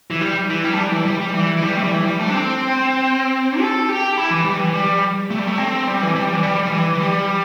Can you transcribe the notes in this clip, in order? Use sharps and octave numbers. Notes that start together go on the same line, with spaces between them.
E3
G3
E3
G3
A3
G3
E3
G3
G3
E3
E3
G3
A3
G3
E3
G3
A3
D4
C4
A4
G4
E4
E3
G3
E3
G3
A3
G3
A3
C4
G3
E3
G3
E3
G3
G3
E3
E3
G3